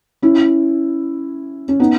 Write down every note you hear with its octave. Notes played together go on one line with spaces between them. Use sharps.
C#4 E4
C#4
B3 D#4